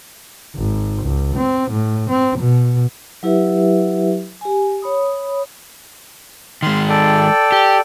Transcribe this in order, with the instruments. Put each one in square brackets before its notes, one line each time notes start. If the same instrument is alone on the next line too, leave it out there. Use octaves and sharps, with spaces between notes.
[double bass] G#1
C#2
C4
A2
C4
B2
[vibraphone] F#3 E4 G4 B4 E5
G4 G#5
C#5 B5 D#6
[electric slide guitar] D#3 G#3 [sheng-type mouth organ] C6 F6
[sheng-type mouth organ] A4 D5 G5
[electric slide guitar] G4